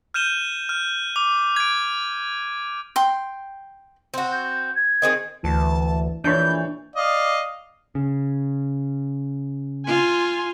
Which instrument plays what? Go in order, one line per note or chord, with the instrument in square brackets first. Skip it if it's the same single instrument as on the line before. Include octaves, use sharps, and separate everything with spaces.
[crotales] F6 G6 D#7 E7 G7
F6
D6
G#6 D7
[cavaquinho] G5 C6
[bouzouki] C4 F#4
[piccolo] G6
G#6
[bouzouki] D#3 C4 G#4
[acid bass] D2 [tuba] E3 [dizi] A5
[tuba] A#1 [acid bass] E3 [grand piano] D4 C#5 [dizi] G6
[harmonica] D5 D#5 F5
[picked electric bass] C#3
[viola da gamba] F4 [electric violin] G#5 C6